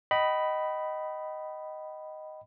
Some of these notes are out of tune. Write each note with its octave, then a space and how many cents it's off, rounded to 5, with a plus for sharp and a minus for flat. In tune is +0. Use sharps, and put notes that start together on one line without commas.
D#5 +0 G5 -40 B5 +0